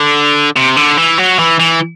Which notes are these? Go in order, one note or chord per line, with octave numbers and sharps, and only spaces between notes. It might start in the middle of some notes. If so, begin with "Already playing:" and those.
Already playing: D3
C3
D3
E3
F#3
E3
E3